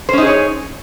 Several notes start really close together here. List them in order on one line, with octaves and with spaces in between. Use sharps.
C5 C#4 D#4 G#4 C#5